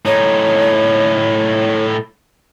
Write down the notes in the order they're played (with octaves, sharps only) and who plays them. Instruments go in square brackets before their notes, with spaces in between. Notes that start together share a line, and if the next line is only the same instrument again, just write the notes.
[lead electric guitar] A2 D#4 [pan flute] C#5